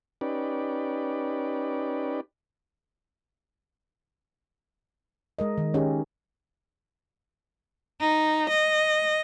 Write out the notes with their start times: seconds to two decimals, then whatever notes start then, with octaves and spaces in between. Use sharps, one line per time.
0.21 C#4 D#4 G4 B4 D5
5.39 G#3 A#4 D#5
5.58 D#3
5.74 D#3 C#4 D#4 G4 G#4
8.01 D#4
8.49 D#5